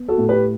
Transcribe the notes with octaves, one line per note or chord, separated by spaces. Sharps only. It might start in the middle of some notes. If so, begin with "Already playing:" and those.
Already playing: B3
F#4 A4
A2
G4 B4